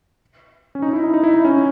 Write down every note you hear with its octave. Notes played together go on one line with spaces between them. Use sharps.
C#4
D#4
E4
D#4
D#4
E4
D#4
C#4